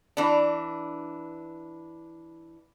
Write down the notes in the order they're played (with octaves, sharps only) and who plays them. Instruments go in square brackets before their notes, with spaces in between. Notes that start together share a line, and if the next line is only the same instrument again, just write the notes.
[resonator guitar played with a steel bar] E3 D4